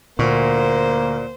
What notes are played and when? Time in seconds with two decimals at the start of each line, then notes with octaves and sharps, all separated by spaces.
0.19 D2 A#2 A#3 C5 C#6